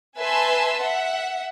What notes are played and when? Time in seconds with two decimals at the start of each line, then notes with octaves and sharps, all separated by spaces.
0.18 B4 E5 G#5 A5 C6 E6
0.82 E5 F#5